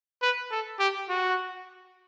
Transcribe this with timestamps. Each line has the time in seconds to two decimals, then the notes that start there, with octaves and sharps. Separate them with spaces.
0.22 B4
0.51 A4
0.79 G4
1.09 F#4